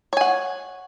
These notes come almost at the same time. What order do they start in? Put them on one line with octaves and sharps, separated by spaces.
C#5 G#5 F#5